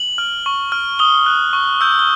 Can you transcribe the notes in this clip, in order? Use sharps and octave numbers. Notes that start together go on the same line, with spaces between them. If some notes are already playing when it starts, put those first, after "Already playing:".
Already playing: F#7
F6
C#6
F6
D#6 G7
F#6
C#6
E6 G6
G7